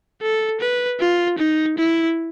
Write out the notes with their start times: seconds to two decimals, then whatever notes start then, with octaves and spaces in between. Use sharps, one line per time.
0.22 A4
0.60 B4
1.00 F4
1.38 D#4
1.78 E4